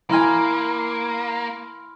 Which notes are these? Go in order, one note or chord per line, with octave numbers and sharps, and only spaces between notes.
E3 A#3 G#5 B5 C6 F6